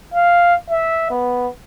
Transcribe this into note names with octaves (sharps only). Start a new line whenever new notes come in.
F5
E5
B3